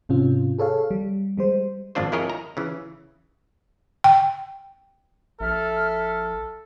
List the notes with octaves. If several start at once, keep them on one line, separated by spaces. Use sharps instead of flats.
G#2 C3 C#4 F4
G#4 A4 C#5 F5
G3
G3 G#3 C5
G#1 F2 D4 F4 C5
F2 E4 G#4 A#4 C#5 D#5
A#5
C#3 E3
G5
A#1 A4 E5 F6